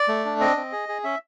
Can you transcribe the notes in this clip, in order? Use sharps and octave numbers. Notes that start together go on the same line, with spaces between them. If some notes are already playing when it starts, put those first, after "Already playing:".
Already playing: D5
A3
D4
C4 D#5
C4
G#4
G#4
C#4 E5